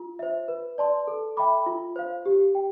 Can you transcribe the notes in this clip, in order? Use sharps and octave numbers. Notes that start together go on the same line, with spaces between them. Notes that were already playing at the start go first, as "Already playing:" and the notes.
Already playing: F4
C5 E5
B4
D5 A5 C6
A4
E5 G5 B5 D6
F4
C5 F5
G4
G5